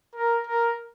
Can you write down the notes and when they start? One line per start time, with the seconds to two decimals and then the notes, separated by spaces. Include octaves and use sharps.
0.15 A#4
0.47 A#4